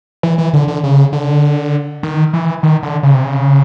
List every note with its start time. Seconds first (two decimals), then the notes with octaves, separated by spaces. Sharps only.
0.23 E3
0.38 E3
0.53 D3
0.68 D3
0.84 C#3
1.13 D3
2.03 D#3
2.33 E3
2.63 D#3
2.83 D3
3.03 C#3
3.14 C3
3.25 C#3